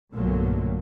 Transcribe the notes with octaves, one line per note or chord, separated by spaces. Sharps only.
B1 G2 A#2 D3 F#3 A3